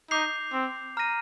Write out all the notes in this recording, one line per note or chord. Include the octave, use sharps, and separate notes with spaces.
D#4 D6 G6 C7 F7
C4
A#5 F6 A#6 D#7